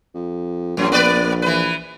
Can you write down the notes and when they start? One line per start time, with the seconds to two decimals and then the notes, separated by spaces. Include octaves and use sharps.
0.15 F2
0.77 A#1 F#2 F#3
0.92 A#3 B4 D5
1.42 E3 B4